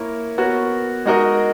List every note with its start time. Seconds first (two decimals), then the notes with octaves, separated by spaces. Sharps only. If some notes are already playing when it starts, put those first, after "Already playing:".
Already playing: A#3 E4 A#4 C#5
0.38 B3 F#4 A#4 C#5
1.06 G#3 D#4 F#4 A#4 D#5